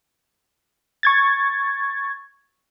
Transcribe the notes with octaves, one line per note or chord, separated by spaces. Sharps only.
C#6 G#6 A6